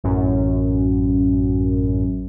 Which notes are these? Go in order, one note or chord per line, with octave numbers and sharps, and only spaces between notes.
A1 F#2